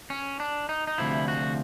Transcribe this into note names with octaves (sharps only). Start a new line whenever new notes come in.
C#4
D4
D#4
D#4
D2 C3 F3 E4
F#4